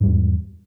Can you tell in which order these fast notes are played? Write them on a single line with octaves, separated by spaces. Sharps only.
G#2 G3 E2